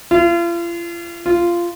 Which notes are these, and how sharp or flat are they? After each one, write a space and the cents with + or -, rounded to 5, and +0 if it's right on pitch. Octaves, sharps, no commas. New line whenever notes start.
F4 -40
F4 -15